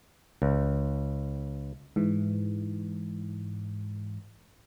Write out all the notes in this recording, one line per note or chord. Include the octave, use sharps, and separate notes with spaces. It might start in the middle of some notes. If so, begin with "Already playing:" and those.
C#2
G#2 E3